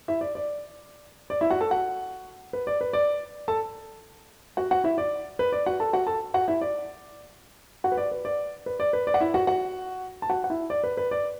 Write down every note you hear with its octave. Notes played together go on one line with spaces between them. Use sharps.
E4 E5
D5
D5
D5
E4 E5
F#4 F#5
A4 A5
F#4 F#5
B4
D5
B4
D5
A4 A5
F#4 F#5
F#4 F#5
E4 E5
D5
B4
D5
F#4 F#5
A4 A5
F#4 F#5
A4 A5
F#4 F#5
E4 E5
D5
F#4 F#5
B4
D5
B4
D5
B4
D5
B4
D5
F#5
E4 E5
F#4 F#5
F#4 F#5
A5
F#4 F#5
F#5
E4 E5
D5
B4
B4
D5